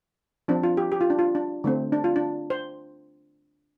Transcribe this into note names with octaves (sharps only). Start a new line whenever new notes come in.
F3 C4 D4
F4
G4
G4
F4
D4
F4
D4
D3 A3 C4
D4
F4
D4
C5